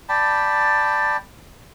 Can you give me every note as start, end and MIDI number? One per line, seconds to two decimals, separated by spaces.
0.09 1.17 74
0.09 1.17 79
0.09 1.17 81
0.09 1.17 83